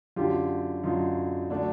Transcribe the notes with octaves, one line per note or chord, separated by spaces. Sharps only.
F#2 D3 F#3 F4 G4
F#2 D3 F#3 D#4 F4
D3 F#3 A3 D4